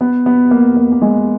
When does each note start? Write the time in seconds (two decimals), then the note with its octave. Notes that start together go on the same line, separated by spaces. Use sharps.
0.01 B3
0.26 B3
0.51 A#3
0.77 A#3
0.92 A#3
1.02 G#3